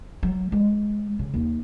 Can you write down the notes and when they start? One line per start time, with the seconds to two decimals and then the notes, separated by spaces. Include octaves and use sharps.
0.23 F#3
0.52 G#3
1.19 C#3
1.34 D#2